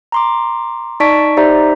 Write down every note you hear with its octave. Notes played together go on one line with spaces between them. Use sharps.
A#5 C6 D6
D#4 D5 A5 C#6 B6 D7
D#4 G4 C5 D5 E5 A#5